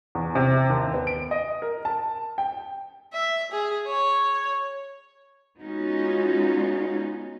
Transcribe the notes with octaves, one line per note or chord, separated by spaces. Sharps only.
E2
C3
D#2
B3
D7
D#5
A#4
A5
G5
E5
G#4
C#5
G#3 B3 C#4 D#4 F4 F#4